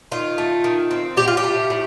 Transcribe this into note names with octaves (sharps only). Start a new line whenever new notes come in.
D#3 F4
A3
D#3
C4
A2 G4
F4
G4
A3
A2